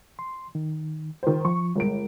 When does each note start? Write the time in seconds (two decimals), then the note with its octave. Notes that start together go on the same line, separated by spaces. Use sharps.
0.19 C6
0.55 D#3
1.23 D#3 C5
1.45 F3 C#6
1.76 G1 G#3 A#4 D7